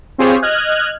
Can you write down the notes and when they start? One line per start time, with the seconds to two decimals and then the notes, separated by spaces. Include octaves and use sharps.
0.18 C4 F4 G4 G#4 C5 C#5
0.42 D#5 F6 F#6 G#6